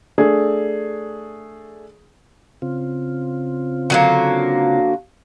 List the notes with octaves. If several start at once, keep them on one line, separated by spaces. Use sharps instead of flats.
A3 D4 G#4
C#3 C4 F4
D3 F#3 A#3